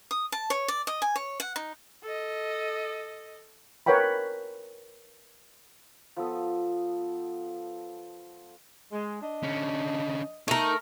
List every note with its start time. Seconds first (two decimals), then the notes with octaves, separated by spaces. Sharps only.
0.11 D#6
0.32 A5
0.50 C#5
0.68 D5
0.87 D#5
1.02 G#5
1.16 C#5
1.40 F#5
1.56 D#4
2.03 A4 D#5
3.86 A#4 B4 C#5 F#5 G5 B5
6.17 F3 B3 A4 D#6
8.92 G#3
9.22 D4 D#5
9.43 D3 C#4
10.48 A3 D#4 A#4